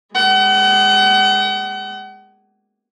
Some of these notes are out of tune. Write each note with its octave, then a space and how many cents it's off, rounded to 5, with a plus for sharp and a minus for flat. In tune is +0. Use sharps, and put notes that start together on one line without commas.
G#3 -15 F#5 +40